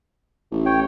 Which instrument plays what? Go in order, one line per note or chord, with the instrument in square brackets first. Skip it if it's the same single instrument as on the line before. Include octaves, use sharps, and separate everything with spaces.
[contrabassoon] A1
[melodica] C#5 G5